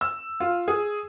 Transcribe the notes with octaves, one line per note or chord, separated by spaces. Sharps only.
E6
F4
G#4